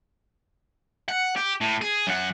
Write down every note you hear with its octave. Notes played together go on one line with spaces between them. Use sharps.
F#5
G4
A2
G#4
F#2 F#5